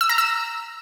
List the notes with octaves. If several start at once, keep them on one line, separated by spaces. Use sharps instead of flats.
E6
A#5
E6